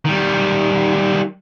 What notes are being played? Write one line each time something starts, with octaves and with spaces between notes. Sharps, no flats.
D#3 G3